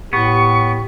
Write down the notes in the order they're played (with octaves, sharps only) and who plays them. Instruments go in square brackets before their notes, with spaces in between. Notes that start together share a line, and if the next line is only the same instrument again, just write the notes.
[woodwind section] A2 [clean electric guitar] B3 [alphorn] G4 [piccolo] C#6